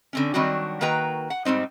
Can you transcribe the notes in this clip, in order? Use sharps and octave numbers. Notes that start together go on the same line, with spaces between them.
D3 C4 C#4
D#3 F#3 G3 C4 D4 F#4
D#3 A#3 F#4 B4 G5 A#5
F#5
G#2 G3 C4 D#4